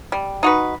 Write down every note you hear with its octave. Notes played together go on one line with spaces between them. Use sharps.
G3
D#4 F#4 B4